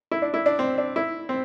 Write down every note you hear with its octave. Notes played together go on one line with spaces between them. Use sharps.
E4
D4
E4
D4
C4
D4
E4
C4